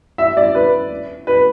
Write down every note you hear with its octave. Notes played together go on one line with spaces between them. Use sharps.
E5
D5
B4
B4